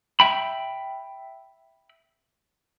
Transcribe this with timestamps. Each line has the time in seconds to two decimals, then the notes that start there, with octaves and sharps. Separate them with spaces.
0.20 E5 G5 B5